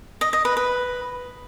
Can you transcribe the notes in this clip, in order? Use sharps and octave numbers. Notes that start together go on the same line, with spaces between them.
D#5
D#5
B4
B4